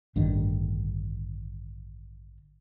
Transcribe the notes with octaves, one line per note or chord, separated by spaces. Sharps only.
A1 G2 D3 D#3